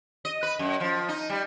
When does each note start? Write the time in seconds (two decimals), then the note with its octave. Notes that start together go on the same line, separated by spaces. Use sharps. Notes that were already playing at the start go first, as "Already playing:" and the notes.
0.25 D#5
0.43 B4
0.59 F#2
0.80 F3
1.09 D#4
1.29 G3